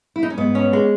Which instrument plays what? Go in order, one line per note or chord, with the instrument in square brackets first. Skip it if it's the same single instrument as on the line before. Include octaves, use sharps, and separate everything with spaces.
[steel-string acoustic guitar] E4
D#4
C#4
[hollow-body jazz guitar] G#2 [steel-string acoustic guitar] B3
[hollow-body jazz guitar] C#4
G#3